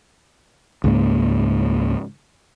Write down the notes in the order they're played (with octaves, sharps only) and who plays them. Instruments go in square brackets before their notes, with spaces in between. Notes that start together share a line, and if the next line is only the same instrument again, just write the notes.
[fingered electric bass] C#2 G#2 A#3